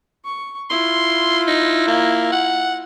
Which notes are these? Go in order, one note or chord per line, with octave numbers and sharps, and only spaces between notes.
C#6
E4 F4 C6
D#4
A#3
F#5